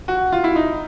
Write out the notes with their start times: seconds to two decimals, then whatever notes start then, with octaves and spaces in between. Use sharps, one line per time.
0.08 F#4
0.32 F4
0.44 E4
0.56 D#4